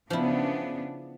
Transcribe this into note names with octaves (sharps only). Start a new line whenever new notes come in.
C#3 F3 B3 D4 E4